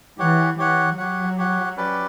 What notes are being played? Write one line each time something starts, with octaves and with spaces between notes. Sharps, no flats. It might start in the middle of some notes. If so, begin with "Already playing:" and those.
E3 G4 C#5 F#5
E3 G4 C#5 F#5
F#3 G4 C#5 F#5
G4 C#5 F#5
C#4 G4 B4 D5